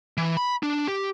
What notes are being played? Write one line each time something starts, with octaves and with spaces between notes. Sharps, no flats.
E3
B5
D4
G4